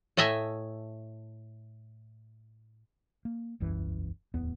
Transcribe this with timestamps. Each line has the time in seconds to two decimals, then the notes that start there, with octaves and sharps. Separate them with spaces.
0.17 A2 A3 D#5 E5 G#5
3.25 A#3
3.60 E1 C2 F#2 E3
4.34 D1 E2 B3